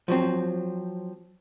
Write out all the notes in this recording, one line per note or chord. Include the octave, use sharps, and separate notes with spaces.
F3 F#3 C4